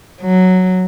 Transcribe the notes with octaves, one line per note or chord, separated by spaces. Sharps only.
F#3